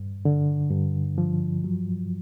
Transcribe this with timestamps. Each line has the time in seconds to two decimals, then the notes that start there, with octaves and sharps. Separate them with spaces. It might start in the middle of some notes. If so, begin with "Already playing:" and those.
Already playing: G2
0.25 D3
0.71 G2
1.18 F3
1.64 F#3